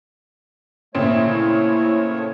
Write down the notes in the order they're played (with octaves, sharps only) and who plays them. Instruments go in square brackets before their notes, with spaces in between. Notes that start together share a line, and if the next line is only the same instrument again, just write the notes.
[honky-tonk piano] A#2 C#3 C4 [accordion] A3 C#5 [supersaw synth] E4